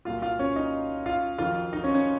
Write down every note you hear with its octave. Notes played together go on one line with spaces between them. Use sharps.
C2 A#2 F#3 F4 F5
F4 F5
C#4 C#5
D#4 D#5
F4 F5
F2 D#3 F#3 F4 F5
D#4 D#5
C#4 C#5
C#4 C#5